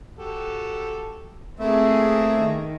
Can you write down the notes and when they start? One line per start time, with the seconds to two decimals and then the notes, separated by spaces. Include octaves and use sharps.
0.19 F#4 G4 A4
1.59 A3 A#3 C4 E4 G#4 E5
2.39 D#3